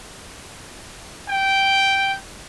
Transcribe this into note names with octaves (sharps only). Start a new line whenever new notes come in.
G5